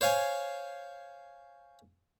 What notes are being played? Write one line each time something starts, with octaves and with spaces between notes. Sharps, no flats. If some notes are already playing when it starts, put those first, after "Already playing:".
C5 C#5 F5 G#5